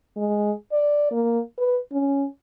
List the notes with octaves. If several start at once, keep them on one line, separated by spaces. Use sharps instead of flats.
G#3
D5
A#3
B4
C#4